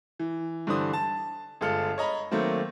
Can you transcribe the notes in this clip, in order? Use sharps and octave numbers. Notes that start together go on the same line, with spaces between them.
E3
G2 D3 E3 D4 C5 D#6
A5
G1 G#3 F4 A4 F6 C#7
C#5 D#5 A#5 B5
D#3 F#3 A3 A#3 C4